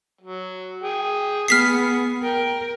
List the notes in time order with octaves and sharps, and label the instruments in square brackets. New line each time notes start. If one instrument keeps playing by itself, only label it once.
[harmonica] F#3
G#4 G5
[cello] B3 [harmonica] G#4 [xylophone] F6 B6 C7
[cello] A#4 [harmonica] G5